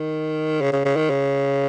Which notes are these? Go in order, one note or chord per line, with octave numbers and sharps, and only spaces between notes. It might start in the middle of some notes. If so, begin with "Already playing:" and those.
Already playing: D#3
C#3
C#3
C#3
D#3
C#3